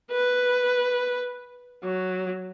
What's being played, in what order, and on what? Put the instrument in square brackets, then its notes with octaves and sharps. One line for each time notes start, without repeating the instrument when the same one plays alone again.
[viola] B4
F#3